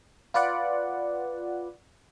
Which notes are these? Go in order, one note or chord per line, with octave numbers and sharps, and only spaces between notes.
F4 B4 D5 F#5